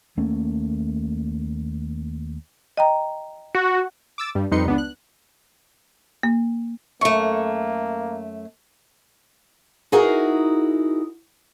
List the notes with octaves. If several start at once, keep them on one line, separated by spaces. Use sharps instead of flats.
D#2 A3 A#3 C#4
D#5 G5 A#5
F#4
D6 E6 A6
G2 G3
F2 G3 D#4 B4 C6 C#7
C#2 B3 D4
F#6
A#3
F#2 A3 A#3 C#6
D#4 E4 F#4 G#4 A#4